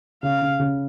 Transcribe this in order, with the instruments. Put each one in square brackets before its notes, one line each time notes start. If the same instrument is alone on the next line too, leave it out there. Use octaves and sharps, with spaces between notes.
[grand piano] C#3 [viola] F5
[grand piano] C#3
C#3